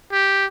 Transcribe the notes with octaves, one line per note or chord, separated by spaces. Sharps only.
G4